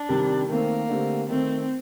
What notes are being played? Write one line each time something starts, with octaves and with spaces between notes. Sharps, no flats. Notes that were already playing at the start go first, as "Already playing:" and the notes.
Already playing: D4
C3 D#3 G3
D#3 A3 A#3 C4
D3 A3 C4 G4
D#3 A3 C4 D#4